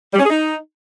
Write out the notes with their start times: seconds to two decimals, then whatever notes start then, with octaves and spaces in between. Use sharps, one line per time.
0.14 G3
0.19 C#4
0.25 G#4
0.30 D#4